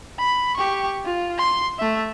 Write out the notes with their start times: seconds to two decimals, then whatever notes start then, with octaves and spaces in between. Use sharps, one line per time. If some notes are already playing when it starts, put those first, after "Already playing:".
0.19 B5
0.56 G4 C#6
1.05 F4
1.38 C6
1.79 A3 E5